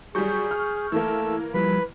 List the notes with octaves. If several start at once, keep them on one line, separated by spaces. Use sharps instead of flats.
F#3 G3 G#4 C#6 G6
F6
E3 A3 A#3 E6
F3 G3 B4 B5